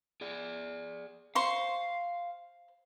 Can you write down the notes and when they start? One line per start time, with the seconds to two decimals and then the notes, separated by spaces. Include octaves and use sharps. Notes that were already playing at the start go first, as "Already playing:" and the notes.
0.21 G#4 D5
1.35 C5 F5 C6 C#6